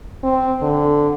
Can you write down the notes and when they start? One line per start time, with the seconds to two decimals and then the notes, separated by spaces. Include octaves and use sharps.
0.23 C4
0.62 D3